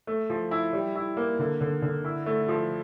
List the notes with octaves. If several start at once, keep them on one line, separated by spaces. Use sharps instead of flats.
A3
F3
E4
G3
E4
A#3
D3
D3
D3
E4
A3
F3